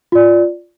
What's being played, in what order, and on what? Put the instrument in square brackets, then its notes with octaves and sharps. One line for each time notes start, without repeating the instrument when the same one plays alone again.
[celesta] F4 D5